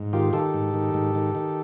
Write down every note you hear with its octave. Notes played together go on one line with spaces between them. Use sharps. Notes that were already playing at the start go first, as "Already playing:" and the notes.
Already playing: G#2
D#3 F4 G4
D#3 G4 A4
G#2
D#3
G#2
D#3
D#3